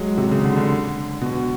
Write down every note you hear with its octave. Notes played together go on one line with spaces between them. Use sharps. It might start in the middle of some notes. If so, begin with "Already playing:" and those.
Already playing: F#3 G#3
C3
C#3
D3
D3
B2